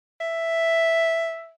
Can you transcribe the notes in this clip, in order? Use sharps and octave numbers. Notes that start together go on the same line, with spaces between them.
E5